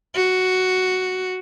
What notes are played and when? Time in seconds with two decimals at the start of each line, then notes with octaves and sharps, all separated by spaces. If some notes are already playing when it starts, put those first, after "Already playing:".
0.15 F#4